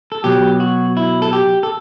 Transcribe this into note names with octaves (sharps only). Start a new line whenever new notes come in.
A4
B2 F#3 G4
F#4
E4
A4
G4
A4